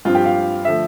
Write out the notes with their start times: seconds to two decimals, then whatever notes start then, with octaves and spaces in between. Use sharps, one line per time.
0.05 G2 F3 C4 F4
0.15 G4
0.25 F5
0.65 D3 F3 A3 E5